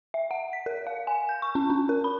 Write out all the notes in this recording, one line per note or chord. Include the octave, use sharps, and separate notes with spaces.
E5
F#5
B6
A#4
F5
G#5
G6
C#6
C#4
D4
A#4
B5